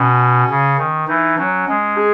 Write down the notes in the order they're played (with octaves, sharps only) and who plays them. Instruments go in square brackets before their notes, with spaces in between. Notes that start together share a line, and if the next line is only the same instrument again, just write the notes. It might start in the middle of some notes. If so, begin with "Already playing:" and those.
Already playing: [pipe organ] B2 [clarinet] C#4
[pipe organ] C#3
D#3
[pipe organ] E3 [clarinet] D#4
[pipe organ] F#3 [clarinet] C#4
[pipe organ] G#3 [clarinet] C#4
[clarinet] G#4